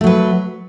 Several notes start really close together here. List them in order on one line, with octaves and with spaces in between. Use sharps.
A3 F#3 B4